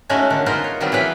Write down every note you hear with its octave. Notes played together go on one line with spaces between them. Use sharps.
G#3 A3 C#4 D#4 F#4 C#5
D3 D#3 D4
B3 D#4 F4 G#4 A#4 C5
C#5
D#3 F#3 G3 B3 C4 F4
E3 G#4 B4 F5 G5